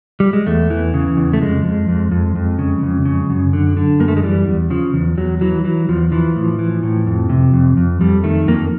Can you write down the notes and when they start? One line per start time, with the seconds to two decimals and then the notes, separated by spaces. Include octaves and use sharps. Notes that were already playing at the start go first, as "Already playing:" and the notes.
0.20 G3
0.33 G#3
0.47 E2 A3
0.70 E3
0.94 C#3
1.17 E2
1.33 A3
1.41 F2 G#3
1.65 F2
1.88 F2
2.11 F2
2.35 F2
2.59 C#3
2.83 F2
3.05 C#3
3.30 F#2
3.53 D3
3.77 D3
4.00 F#2 A#3
4.08 A3
4.17 G#3
4.23 E3 G3
4.47 E2
4.70 C#3 F3
4.94 E2
5.18 E2 F#3
5.41 E3 F#3
5.65 E3 F#3
5.89 E2 F3
6.12 E3 F3
6.36 A2
6.59 E3
6.83 A2
7.07 F2
7.29 C3
7.54 F2
7.77 F2
8.01 F2 G3
8.24 D#3 A3
8.48 F2 A#3